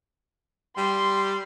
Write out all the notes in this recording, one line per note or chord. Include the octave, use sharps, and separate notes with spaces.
G3 C6